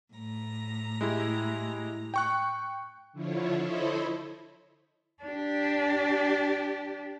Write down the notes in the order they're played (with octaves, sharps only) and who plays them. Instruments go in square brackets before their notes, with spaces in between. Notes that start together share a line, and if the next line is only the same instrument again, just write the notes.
[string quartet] A2 A#5
[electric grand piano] G#3 E4 G4
G5 C#6 F#6
[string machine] D3 F3 E4 F4 C#5
E4 A4 C5 C#5 D#5 B5
[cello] D4 G4